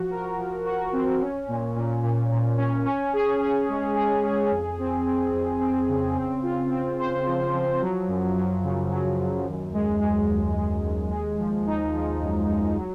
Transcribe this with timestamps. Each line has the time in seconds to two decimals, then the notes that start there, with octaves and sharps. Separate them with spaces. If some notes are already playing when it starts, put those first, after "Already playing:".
Already playing: F3 F#4
0.11 A#4
0.38 F3
0.66 F#4
0.93 C4
1.20 C#4
1.48 A#2
1.76 A#2
2.03 A#2
2.31 A#2
2.58 C#4
2.86 C#4
3.13 G#4
3.41 G#4
3.68 G#3
3.95 G#4
4.23 G#4
4.51 F2
4.78 C4
5.06 C4
5.33 F2
5.61 C4
5.88 C#3
6.16 C4
6.43 F4
6.70 C4
6.99 C5
7.26 F3
7.53 F3
7.81 F#3
8.08 F#2
8.36 F#3
8.64 C#3
8.91 F#3
9.18 F#2
9.46 D#2
9.73 G#3
10.01 G#3
10.28 D#2
10.56 G#3
10.83 D#2
11.11 G#3
11.38 F3
11.66 D#4
11.93 F3
12.21 F#2
12.48 F#2
12.76 F#3